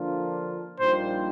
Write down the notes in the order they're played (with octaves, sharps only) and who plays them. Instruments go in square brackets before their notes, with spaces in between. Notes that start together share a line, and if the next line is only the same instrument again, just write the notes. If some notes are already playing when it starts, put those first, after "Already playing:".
Already playing: [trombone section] D3 F3 A#3 D4 F4
[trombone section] A#1 A#2 G3 A#3 D#4 [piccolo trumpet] C5